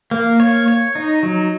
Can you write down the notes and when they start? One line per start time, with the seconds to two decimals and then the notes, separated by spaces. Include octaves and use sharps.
0.11 A#3
0.40 C#5
0.68 C#5
0.95 D#4
1.23 F#3